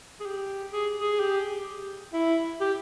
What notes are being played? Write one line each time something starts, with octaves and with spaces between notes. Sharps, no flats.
G#4
G4
G#4
G#4
G4
E4
G4